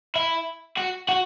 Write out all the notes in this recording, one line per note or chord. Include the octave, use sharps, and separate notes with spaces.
E4
F#4
F#4